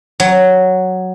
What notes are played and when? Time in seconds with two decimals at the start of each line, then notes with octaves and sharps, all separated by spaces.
0.20 F#3